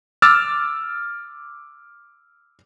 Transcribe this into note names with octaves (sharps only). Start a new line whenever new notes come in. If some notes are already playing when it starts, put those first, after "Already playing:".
D6 E6 F6 A6